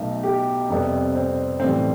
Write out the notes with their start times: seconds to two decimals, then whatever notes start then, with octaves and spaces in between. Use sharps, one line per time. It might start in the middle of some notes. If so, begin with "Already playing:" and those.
Already playing: B1 B2 A3 E5
0.23 G4
0.69 F2 C3 G3 B3
1.15 C4
1.60 B1 A2 E3 G3 C4